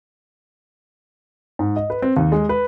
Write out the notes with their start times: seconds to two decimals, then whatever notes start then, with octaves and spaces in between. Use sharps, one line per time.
1.59 G#2
1.76 D#5
1.90 B4
2.02 C4
2.17 D#2
2.32 G#3
2.49 B4